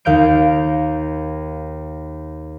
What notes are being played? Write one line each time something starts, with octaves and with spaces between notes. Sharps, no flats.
D#2 F5 G6 D7